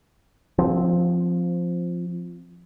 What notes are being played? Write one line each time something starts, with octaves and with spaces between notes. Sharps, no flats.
F3 C4